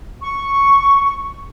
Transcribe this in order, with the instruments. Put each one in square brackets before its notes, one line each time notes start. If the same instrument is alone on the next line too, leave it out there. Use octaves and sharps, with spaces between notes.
[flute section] C#6